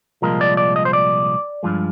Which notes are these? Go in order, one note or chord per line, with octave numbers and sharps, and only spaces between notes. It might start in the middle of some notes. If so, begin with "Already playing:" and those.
C2 A#2 F3 G#3 A#4
D5
D5
D#5
C5
D5
G2 F3 G#3